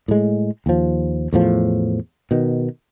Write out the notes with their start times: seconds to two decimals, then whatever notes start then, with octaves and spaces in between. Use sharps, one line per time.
0.08 A2 G#3
0.66 D#2 F3
1.33 E2 A2 F3
2.31 B2 D#3